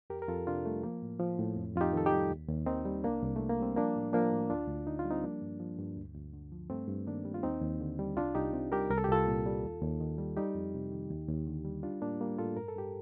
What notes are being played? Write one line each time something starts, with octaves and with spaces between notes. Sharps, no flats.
F2 G4 A#4
A#4
F2 F4 A4
C3 D4 F4
G3 A3
F3 A#3
A2
F3
A2
F2
F2 D#4 F4 G4
D#3 A4
D#4 G4
G3
D#2
D#2
D#3 C4 D#4
G3
C2 A#3 D4
C2
C3 A3
A#3
G3 C4
F3 A#3 D4
A2
F3 A#3 D4
A2
D2 D4 F4
D2
D3 D#4
F4
G3
C4 D#4
F3 A#3 D4
G2
F3
G2
D2
D2
D3
F3
G2 A3 C4
G2
D#3 A#3 D4
G3
F4
D#2 C4 D#4
D#2
D3
G3
C2 D4 F4
C2 D#4 G4
C3
G3 G4 A#4
C2 A#4
A4
G4
C2 F4 A4
A#2
G3
D#2
D#2
D#3
G3
G3 D#4 G4
F2
C3
D#3
D#2
D#2
D3
G3
G3 D4 F4
A2 A#3 D4
G3 A#3
A2 F4 A4
G2 A#4
A4
G2 G4